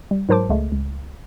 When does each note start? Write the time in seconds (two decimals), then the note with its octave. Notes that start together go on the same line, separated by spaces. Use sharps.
0.11 G3
0.29 G#2 F#3 A#4 C5 A5 D6
0.49 C#2 G#3 A3
0.72 C#2